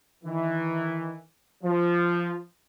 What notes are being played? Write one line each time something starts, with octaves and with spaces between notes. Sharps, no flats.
D#3 E3
F3